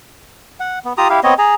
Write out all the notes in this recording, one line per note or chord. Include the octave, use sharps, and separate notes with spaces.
F#5
B3
F4 G4 A#5 D#6
E4 G4 F5
B3 C4 C#5 D#5
G#4 G#5 A#5